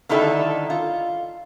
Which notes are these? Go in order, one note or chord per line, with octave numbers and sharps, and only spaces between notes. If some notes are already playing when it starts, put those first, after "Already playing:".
D3 D#3 G3 D#4 E4 A4
F4